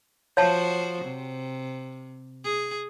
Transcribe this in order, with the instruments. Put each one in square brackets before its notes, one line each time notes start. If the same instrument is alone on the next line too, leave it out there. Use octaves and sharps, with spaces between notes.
[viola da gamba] F3 F#4 C5 [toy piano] C#5 F5 A5
[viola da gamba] C3
G#4